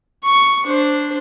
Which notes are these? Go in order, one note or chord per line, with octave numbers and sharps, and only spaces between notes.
C#6
D4 C5